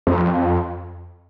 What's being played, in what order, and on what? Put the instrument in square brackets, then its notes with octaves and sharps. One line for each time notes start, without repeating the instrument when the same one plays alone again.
[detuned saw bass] F2